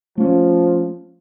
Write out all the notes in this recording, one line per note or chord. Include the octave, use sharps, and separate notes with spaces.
F3 A3 C#4